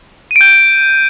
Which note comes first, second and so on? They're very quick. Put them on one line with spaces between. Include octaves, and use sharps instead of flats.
D#7 D7 G6